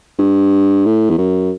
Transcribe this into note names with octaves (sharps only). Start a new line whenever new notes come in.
G2
A2
E2
F#2